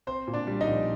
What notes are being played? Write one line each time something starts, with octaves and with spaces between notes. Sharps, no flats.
C4 C5 C6
A#2
D4 D5
G3
D#4 D#5
A#1